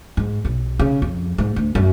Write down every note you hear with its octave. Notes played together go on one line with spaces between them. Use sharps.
G#2
B1
C#3
F2
G#2
D2
F#2